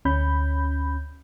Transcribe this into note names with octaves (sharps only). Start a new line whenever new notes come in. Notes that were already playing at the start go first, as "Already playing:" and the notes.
D2 C#4 B5 G6